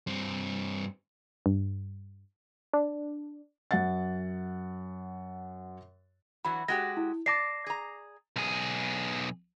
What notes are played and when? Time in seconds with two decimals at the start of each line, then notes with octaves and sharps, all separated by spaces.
0.07 G2 C4
1.46 G2
2.73 D4
3.71 F#2 F#5 A6
6.45 E3 F#3 F#4 B5
6.68 G#3 F#4 G4 A#6
6.97 E4
7.26 D5 A5 D6 A#6 C7
7.66 G#4 A#5
8.36 B1 G#4